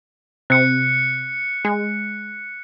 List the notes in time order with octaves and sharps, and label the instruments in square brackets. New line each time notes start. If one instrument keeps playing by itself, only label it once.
[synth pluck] C3 [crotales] F#6 C#7
[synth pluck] G#3